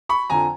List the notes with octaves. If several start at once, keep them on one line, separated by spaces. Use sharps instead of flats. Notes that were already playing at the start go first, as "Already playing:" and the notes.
B5 C#6
F2 D3 F3 G#5 A#5